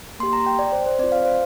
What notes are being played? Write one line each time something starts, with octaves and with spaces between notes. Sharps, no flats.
A#3 G4 C6
A#5
G5
D5
C5
C5
C4 F4 D5
F5
C5